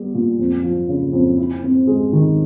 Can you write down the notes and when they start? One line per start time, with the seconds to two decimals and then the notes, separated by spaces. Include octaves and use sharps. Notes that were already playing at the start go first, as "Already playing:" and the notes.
Already playing: G3 B3
0.14 A#2
0.39 F2
0.63 F3
0.89 C#3
1.13 F2
1.38 E4
1.63 C4
1.87 G#3
2.13 D#3